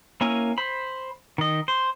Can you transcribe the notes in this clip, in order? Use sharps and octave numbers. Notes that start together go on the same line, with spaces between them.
A#3 C#4 E4 A#4 G#5
C5 B5
D#3 D#5
C5